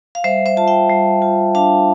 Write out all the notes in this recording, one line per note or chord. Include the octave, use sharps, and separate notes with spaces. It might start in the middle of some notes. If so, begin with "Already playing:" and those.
F5
G3 C5 E5
C5 E5
F4 A5
E5 G5
G3
F4
D4 F5 A5